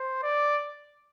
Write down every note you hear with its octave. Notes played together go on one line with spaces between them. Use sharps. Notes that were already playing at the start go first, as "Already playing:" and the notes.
Already playing: C5
D5